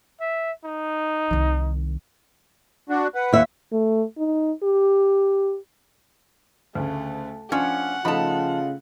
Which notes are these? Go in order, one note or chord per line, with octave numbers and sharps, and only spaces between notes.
E5
D#4
C2 D#3
D4 F#4
B4 F#5
D#2 E5
A3
D#4
G4
D2 C#3 A3
F3 C#4 D4 F4 F#5
C#3 F3 A3 D#4 F4 A5 B5